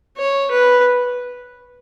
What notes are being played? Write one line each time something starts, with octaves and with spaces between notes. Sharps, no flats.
C#5
B4